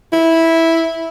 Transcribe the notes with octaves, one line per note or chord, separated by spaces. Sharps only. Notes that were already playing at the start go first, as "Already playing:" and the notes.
E4